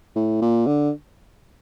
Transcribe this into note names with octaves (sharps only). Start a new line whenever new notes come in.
A2
A#2
D3